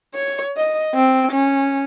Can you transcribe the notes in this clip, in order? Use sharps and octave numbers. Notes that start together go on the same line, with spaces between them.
C#5
D#5
C4
C#4